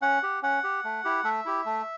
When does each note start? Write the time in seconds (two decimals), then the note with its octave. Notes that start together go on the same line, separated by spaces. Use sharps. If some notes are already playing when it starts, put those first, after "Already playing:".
0.02 C#4 F#5
0.23 G4
0.43 C#4 F#5
0.64 G4
0.84 A3
1.05 E4 G4
1.24 A3 E5
1.46 E4 G4
1.66 A3